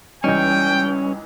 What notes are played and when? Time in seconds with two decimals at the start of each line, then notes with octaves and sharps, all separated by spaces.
0.24 C#2 E3 G3 C#4 D#4 G5